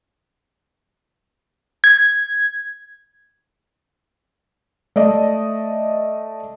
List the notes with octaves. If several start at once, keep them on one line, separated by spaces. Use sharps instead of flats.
G#6
A3 D5 D#5